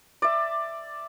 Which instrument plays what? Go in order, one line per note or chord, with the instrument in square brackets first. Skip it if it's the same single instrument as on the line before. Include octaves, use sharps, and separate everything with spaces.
[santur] D5 E5